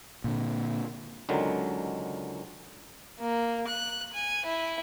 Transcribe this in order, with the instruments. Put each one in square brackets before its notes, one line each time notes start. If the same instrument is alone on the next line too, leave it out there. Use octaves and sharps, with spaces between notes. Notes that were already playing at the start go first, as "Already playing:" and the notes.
[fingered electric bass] A#2 D3
[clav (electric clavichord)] C#2 D3 D#3 F#3
[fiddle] A#3
F#6
G#5
E4